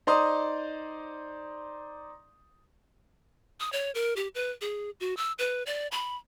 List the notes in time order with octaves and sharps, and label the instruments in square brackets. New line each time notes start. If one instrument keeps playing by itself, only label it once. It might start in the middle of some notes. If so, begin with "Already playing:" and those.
[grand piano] D#4 C5 D5 A#5 C6 D#6
[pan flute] D#6
C#5
A#4
G4
B4
G#4
F#4
E6
B4
D5
B5